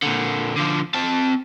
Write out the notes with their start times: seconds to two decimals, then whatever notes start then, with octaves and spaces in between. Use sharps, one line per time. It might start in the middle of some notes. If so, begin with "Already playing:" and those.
0.02 A#2 D3
0.57 D3 F3
0.94 C4 A5